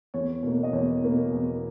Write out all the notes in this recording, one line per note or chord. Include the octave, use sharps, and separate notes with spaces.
E2 C#5
B2 A#3
D#5
E2 C#5
B2 A#3
E2